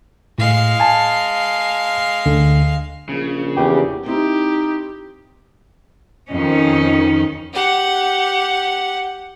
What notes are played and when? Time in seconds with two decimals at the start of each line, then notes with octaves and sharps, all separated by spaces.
0.38 A2 G#3 F5
0.80 G#5 A5
2.26 D2 D3
3.09 A#1 C#3
3.57 E2 G4
4.06 C4 D#4 E4 G4
6.31 F2 D#3 C#4 D#4
7.53 G4 F#5